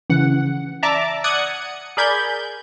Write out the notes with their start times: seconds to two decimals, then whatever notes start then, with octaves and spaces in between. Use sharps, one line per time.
0.10 C#3 E3 F#5
0.83 D5 E5 A5 A#5 D6
1.24 D5 F#5 D#6 F#6 G#6 C#7
1.97 G#4 A#4 D5 B5 G6 G#6